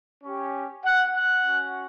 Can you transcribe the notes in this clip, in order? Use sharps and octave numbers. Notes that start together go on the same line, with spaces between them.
C#4 G4
F#5
F#5
C#4 F#4